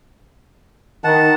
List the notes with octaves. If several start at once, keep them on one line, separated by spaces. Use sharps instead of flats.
D#3 F#5 A5